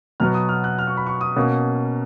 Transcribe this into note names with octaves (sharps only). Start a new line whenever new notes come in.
B2 F#3 B3 F6
D#6
F6
F#6
F6
C#6
B5
C#6
D#6
B2 A#3 C#4